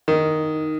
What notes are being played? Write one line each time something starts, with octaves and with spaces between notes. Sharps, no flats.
D#3